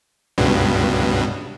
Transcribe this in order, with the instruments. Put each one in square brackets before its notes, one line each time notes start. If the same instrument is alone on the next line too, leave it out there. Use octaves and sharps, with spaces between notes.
[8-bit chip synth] C#2 G2 B2